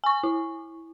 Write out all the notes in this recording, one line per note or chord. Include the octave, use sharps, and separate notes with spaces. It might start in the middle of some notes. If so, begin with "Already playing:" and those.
G#5 C#6
E4